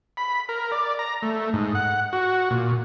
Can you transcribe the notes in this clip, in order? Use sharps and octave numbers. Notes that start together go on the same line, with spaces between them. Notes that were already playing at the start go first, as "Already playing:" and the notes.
B5
A#4
D5
A#5
A3
G#2
F#5
F#4
A#2